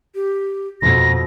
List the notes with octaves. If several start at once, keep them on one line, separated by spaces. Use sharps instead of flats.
G4
F2 B2 A#6